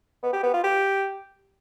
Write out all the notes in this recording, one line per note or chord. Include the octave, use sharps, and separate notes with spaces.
B3
G4
B3
F4
G4